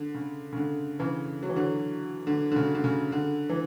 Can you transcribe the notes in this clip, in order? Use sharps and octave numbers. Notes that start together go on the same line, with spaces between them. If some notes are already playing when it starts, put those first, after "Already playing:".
Already playing: D3
C#3
C#3
D3
C#3 E3
F#3
E3
D3 F#3
D3
D3
C#3
D3
C#3
D3
E3